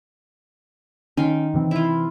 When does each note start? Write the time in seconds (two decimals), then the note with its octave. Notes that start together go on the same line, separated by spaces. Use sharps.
1.17 D#3 C#4 C6
1.54 C3 E3 C4
1.71 E4 F4